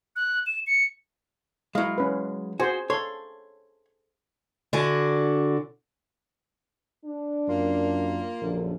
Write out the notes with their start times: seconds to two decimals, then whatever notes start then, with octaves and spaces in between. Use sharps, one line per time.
0.16 F#6
0.47 E7
0.67 C#7
1.75 F#3 G#3 E4 F5
1.98 C#4 B4
2.60 F#4 G#4 C5 G#5
2.90 A4 C#5 C6
4.73 D3 D4 F#4 G#5
7.06 D4
7.48 F#2 A#3 F4 A#4
8.41 A#1 F#2 D3 A4